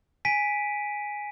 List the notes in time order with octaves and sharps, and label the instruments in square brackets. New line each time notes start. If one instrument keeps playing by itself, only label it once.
[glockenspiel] G#5 B6 D7 D#7